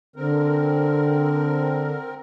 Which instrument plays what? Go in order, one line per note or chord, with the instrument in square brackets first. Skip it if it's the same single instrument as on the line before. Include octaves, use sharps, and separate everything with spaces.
[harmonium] D3 [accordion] C4 A#4